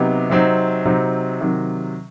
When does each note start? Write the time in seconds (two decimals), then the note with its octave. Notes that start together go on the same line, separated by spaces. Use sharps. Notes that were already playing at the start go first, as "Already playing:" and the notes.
Already playing: C3 F#3 B3 D#4 G4
0.30 C3 F#3 C4 D#4
0.85 C3 F#3 C4 D#4
1.41 C3 D#3 F#3